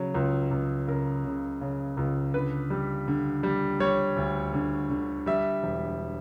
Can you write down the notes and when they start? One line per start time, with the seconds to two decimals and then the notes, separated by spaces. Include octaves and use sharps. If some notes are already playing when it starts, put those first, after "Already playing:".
Already playing: C#3 F#3
0.14 C#2
0.51 C#2
0.87 C#3 A#4
1.25 C#3
1.61 C#3
1.97 C#2
2.34 D3 B4
2.70 G3
3.08 D3
3.43 G3
3.80 G3 C#5
4.16 D2
4.53 D3
4.90 D3
5.26 G3 E5
5.63 E1